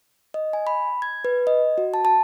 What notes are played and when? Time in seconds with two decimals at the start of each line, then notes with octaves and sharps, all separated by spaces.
0.34 D#5
0.53 G#5
0.67 B5
1.02 G#6
1.25 B4
1.47 D#5
1.78 F#4
1.94 A5
2.05 A5